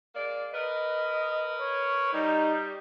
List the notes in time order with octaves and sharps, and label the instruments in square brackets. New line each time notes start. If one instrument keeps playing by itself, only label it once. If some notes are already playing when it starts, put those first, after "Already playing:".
[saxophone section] G#3 A#3 D5
[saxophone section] A#4 B4 [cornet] D#5
[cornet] C#5
[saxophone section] G3 [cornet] D#4